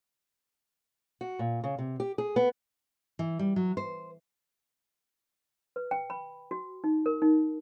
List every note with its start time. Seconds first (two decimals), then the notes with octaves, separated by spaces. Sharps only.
1.21 F#4
1.39 A#2
1.64 C#3
1.78 C3
2.00 G4
2.18 G#4
2.36 B3
3.19 E3
3.39 G3
3.56 F#3
3.77 C5
5.76 B4
5.91 G5
6.10 B5
6.51 F#4
6.84 D#4
7.06 A#4
7.22 D#4